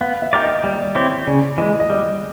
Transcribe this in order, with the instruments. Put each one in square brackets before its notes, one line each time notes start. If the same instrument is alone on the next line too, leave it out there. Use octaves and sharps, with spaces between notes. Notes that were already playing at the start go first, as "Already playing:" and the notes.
[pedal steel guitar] B3 [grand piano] F5
[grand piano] E5
[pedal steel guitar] D#4 G4 A#4 D5
[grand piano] D#5
[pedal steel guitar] G3 [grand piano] D5
[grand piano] D#5
D5
[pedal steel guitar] C4 E4 G4 [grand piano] C#5
[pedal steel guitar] C#3 [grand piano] D5
[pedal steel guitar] E3 G#3 [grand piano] D#5
[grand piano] D#5
[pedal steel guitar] G3 [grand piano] D5